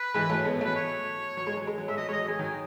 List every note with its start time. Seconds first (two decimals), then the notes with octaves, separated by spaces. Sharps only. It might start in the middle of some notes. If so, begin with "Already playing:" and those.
Already playing: B4
0.14 E3 G#3
0.30 F#3 A3
0.45 G#3 B3
0.60 F#3 A3 B4
0.76 C#5
1.37 F#3
1.47 G#3
1.57 F#3
1.67 G#3
1.78 F#3
1.88 G#3 E5
1.97 F#3 D#5
2.08 G#3 C#5 D#5
2.18 F#3
2.28 G#3 G#5
2.39 D#3 F#3 G#5